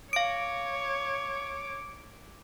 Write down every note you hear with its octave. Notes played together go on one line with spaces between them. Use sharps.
C#5 F5 D6 D7